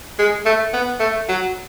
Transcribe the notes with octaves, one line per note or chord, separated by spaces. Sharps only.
G#3
A3
B3
A3
F#3